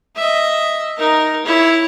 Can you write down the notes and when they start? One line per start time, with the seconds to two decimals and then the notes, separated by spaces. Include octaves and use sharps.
0.16 D#5 E5
0.97 D#4 A#4
1.46 E4 C#5